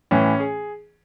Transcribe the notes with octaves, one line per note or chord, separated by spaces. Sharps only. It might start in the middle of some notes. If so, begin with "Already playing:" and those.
A2 E3 C#4
G#4